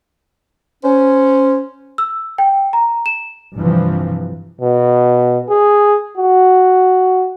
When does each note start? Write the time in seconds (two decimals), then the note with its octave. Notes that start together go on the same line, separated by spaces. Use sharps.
0.84 C#4 C5
1.98 E6
2.38 G5
2.73 A#5
3.06 E7
3.57 G2 C3 E3 F3
4.61 B2
5.49 G#4
6.17 F#4